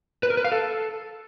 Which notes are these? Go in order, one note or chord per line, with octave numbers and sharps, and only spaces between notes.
B4
A#4
B4
F5
A4